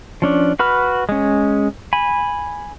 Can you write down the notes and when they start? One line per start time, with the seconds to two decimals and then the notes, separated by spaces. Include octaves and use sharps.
0.22 F3 C#4 D4
0.59 F#4 B4 B5 F6
1.09 G#3 C#4
1.93 G#5 B5